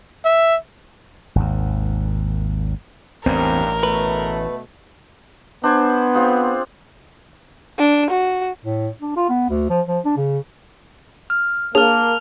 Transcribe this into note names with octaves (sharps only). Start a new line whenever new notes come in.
E5
G#1 D#2
A1 E2 G2 C4 A#4
B2 A3 B4
B3 D4 C5 G#5
C4 F4 G#4
D4
F#4
A2
D4
F4
B3
D2
F3
F3
D4
C#3
F6
A#3 D4 G#4 C#5 A5 F6 F7